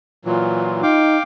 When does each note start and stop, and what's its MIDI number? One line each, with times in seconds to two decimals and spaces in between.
0.25 0.82 46
0.25 0.82 52
0.25 0.82 54
0.25 0.97 65
0.83 1.18 63
0.83 1.23 77
0.83 1.23 79
0.83 1.23 86